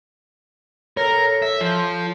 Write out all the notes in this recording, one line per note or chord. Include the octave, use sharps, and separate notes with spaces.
A4 A#4 C#5
E5
F3